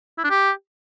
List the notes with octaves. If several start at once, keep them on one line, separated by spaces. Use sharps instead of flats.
E4
D4
G4